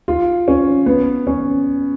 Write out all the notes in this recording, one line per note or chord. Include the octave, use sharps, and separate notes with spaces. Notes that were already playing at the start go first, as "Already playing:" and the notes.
F4
C#4
B3
C#4